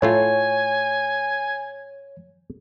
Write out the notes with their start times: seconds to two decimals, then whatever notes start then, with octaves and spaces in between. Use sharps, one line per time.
0.02 A2 A3 F4 C#5 G#5